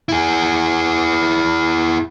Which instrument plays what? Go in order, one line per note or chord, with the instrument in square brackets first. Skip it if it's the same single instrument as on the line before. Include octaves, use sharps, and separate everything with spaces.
[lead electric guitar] E4 G#4